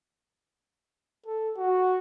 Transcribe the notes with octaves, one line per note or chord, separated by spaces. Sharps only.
A4
F#4